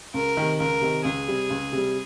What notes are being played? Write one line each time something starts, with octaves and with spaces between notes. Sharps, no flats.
C#2 A#4
C3 D#3
C#2 A#4
C3 D#3
C#2 G#4
C3 G3
C#2
C3 G3